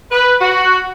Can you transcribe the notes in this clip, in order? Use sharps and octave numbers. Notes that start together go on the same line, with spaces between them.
B4
F#4